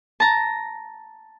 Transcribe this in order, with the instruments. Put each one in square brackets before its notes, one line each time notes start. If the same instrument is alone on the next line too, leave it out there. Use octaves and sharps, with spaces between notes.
[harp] A5 A#5